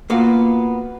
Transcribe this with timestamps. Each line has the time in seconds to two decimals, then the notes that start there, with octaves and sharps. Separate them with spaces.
0.10 A#3 B3 F4 F#4 F5